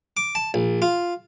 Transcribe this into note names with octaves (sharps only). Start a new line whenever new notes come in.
D6
A5
A#1
F4